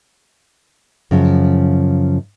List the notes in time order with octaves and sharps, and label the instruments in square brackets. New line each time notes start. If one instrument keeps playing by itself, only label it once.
[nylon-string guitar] F#2 C#3 F3